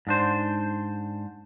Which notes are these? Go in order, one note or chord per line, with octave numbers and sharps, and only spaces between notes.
G#2 D4 C5